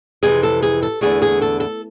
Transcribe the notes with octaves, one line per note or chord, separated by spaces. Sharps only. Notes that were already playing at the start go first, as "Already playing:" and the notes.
F2 C3 E3 G#4
A4
G#4
A4
E2 D3 A3 G#4
G#4
A4
A4